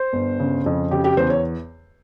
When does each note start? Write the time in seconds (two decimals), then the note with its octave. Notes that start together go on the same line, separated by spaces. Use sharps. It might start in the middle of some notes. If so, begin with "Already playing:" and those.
Already playing: C5
0.13 G1
0.40 C#3
0.66 F2
0.91 C#3 G4
1.04 G4
1.17 E2 C5
1.30 C#5